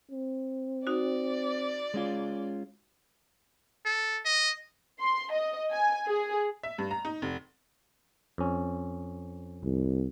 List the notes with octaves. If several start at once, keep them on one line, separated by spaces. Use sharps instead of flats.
C4
D#4 F#4 D5
G#3 C#4 F4
A4
D#5
C6
D#5
G#5
G#4
E5
G2
A#5
D#4
F1
F2 C#4
C2